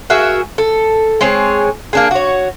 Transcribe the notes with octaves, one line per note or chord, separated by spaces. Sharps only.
F#4 G#4 A#4 E5
A4
G#3 C4 G#4 C#5
A#3 D4 G#4
F#4 C#5